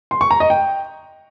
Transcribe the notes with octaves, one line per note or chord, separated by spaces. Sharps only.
C6
C#6
A#5
D#5
G5